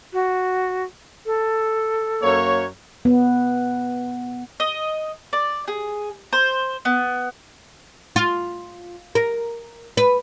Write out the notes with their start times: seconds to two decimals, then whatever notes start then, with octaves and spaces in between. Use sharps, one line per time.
0.13 F#4
1.26 A4
2.23 F#2 A#3 C#5
3.05 B3
4.60 D#5
5.33 D5
5.68 G#4
6.33 C5
6.85 B3
8.16 F4
9.15 A#4
9.97 B4